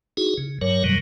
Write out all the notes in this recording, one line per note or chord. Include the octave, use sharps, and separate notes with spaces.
D#4 E4 F#4 G#4
C#3
G2 F#3 A#4 C#5
F#2 B2 D#3 F#3 G3